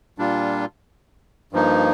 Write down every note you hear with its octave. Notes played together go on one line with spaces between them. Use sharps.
A#2 G3 D4 F4
G2 F3 A#3 D#4